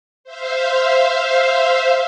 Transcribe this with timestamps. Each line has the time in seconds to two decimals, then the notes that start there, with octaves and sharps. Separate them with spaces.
0.24 C5 E5 F5